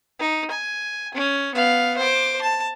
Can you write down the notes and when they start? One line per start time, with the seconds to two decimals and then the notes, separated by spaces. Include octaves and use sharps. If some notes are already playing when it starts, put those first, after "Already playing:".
0.20 D#4
0.51 G#5
1.14 C#4
1.55 B3 F5
1.98 C5 D6
2.42 A5